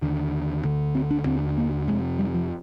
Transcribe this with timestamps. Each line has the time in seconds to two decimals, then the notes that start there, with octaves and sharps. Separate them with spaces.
0.02 D#2 D3
0.64 D2 D3
0.95 C4
1.11 D4
1.26 D#2 D3 C4
1.58 A#3
1.88 F2 C3 G#3
2.19 G3
2.34 F3